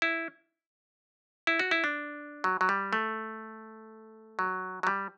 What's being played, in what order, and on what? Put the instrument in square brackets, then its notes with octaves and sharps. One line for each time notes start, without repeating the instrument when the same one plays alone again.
[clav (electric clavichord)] E4
E4
F#4
E4
D4
F#3
F#3
G3
A3
F#3
F#3
G3